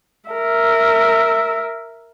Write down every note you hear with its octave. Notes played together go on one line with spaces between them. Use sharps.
A#4 E5